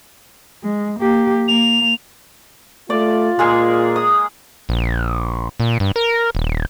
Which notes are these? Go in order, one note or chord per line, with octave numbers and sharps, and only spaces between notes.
G#3
A#3 G4
A#3 F7
A3 F4 D5
A#2 G#3 A#3 G#4
D#6
A#1
A#2
G2
A#4
D#1